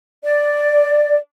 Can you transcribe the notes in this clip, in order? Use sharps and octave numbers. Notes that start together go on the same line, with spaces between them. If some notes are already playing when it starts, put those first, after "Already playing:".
D5